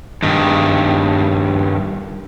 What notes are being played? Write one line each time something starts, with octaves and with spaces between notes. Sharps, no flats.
G2 D#3